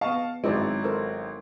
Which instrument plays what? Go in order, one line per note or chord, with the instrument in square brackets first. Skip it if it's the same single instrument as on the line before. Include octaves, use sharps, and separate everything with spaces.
[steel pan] B3 D#5 [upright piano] F5 A5 C#6
[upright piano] G#1 F#3 C4 [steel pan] G#3 E4 D5
[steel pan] A4 A#4 C5